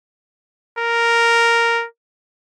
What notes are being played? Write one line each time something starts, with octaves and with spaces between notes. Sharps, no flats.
A#4